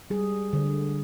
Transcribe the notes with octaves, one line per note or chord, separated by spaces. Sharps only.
G3 G#4
D3